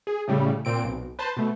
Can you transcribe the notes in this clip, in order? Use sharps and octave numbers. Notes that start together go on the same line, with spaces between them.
G#4
A2 C#3 G3 A3
A#2 C4 D7
B1
B4 C5 A5
B2 A3